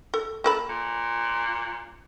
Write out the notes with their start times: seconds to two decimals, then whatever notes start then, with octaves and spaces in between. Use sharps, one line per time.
0.14 A4
0.44 A#3 A4 B5
0.69 A#2